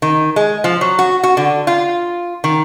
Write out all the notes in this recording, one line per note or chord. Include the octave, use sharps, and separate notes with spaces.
D#3
G#3
F3
F#3
F#4
F#4
D3
F4
D#3